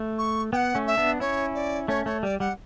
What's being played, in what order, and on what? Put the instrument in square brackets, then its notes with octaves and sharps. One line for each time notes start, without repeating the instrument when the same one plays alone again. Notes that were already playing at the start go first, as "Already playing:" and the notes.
Already playing: [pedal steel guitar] A3
[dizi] C#6
[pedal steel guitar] B3 [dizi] G5
[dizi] F#5
[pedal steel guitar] A3 C#4
[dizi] E5
[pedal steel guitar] B3 D4
[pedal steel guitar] C#4 E4 [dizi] C#5
[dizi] D5
[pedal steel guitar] A3 C#4 [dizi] C#5
[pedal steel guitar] A3 [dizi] C#5
[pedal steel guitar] G3 [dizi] D5
[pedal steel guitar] G3 [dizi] F#5